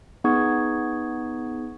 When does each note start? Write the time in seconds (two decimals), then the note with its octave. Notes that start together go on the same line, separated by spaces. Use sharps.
0.24 B3 D#4 G#4 C#6 D#6 G#6